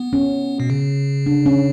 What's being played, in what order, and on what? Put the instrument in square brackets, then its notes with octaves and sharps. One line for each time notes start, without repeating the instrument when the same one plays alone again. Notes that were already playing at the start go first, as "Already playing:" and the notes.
Already playing: [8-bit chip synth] B3
[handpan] C#4
[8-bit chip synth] B2
C#3
[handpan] D4
C#4